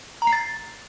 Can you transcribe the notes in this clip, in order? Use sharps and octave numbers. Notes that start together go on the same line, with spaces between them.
A#5
C7
A6